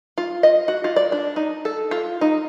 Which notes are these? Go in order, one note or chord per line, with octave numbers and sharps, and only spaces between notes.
F4
D#5
F#4
F4
D5
D4
D#4
A4
F4
D#4